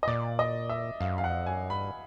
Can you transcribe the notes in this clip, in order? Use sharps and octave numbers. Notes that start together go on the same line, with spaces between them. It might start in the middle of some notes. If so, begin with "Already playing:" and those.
D#5
A#2 D5
D#5
E5
F#2 F5
F5
F2 F#5
F#2 G#5
G2 B5